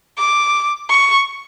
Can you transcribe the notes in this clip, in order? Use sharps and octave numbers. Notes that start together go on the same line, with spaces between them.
D6
C#6